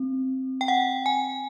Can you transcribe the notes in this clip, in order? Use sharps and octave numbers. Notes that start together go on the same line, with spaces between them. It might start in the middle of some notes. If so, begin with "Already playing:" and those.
Already playing: C4
G5
F#5
G#5